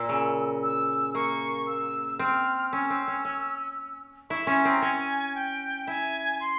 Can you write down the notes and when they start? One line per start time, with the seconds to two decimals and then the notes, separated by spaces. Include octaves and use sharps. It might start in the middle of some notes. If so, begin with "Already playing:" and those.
Already playing: A#2 E6
0.09 C#3
0.63 E6
1.15 A#3 C#6
1.67 E6
2.19 C4 F6
2.72 C#4 E6
2.90 C4
3.08 C#4
3.25 C#4
4.30 E4 C#6
4.47 C#4 C6
4.65 C4 A#5
4.82 C#4 G#5
5.35 G5
5.87 E4 G#5
6.40 C6